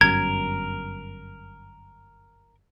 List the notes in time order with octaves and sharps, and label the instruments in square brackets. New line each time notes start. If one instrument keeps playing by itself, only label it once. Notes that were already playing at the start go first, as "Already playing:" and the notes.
[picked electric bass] G1 F#2 [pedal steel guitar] A#4 [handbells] G#6